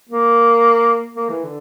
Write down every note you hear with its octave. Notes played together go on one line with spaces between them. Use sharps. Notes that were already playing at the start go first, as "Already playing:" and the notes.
A#3
A#3
E3
D3